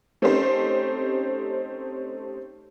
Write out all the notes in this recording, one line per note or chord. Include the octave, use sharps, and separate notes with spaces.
A3 C4 C#4 D#4 G4 C5